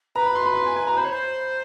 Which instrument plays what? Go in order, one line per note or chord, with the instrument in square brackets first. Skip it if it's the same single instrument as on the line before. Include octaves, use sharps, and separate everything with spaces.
[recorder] B4 [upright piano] A#5
[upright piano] B5
C6
B5
C6
G#5
G#5
A#5
[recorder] C5 [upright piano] B5
[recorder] C#5
C5